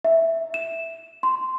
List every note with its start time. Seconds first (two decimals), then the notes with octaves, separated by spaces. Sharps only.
0.05 E5
0.54 E7
1.23 C6